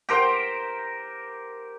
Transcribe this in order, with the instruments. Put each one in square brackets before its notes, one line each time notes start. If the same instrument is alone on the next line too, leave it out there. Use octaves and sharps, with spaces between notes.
[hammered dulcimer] G4 A#4 C5 G5